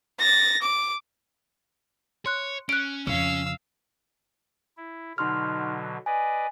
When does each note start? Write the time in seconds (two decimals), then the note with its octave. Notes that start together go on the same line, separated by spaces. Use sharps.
0.19 A6 A#6
0.62 D6
2.26 C#5 C6 F#6
2.69 C#4 F#6 D7
3.07 F2 C#3 C#4 F5 E6
4.78 E4
5.18 B2 D3 F#3 D#4 C6 F6
6.06 B4 D5 D#5 G#5